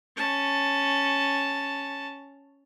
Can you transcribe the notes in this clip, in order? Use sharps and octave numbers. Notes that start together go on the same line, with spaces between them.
C#4 A5